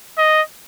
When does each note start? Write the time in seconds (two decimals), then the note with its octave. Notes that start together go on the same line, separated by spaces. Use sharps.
0.18 D#5